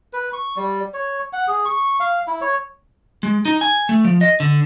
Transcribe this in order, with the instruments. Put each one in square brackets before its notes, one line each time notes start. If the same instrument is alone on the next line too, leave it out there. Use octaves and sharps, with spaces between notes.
[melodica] B4
C#6
G3
C#5
F#5
G#4
C#6
F5
E4
C#5
[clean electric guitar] G#3
D#4
G#5
A3
F3
D#5
D3